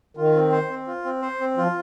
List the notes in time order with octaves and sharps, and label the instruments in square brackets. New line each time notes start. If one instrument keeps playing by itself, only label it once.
[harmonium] D#3 [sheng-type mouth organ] F4
[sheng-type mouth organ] C4
C5
C4
F4
C4
C5
C4
[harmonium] F3 [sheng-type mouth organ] F4